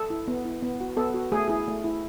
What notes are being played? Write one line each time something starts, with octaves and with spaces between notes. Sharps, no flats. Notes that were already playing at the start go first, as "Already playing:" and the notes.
Already playing: A4
E4
B3
E4
B3
F#4
B3 A4
F#4
A3 G#4
E4 G#4
A3
E4